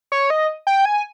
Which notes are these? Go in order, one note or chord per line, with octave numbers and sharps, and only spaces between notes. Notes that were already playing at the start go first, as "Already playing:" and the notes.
C#5
D#5
G5
G#5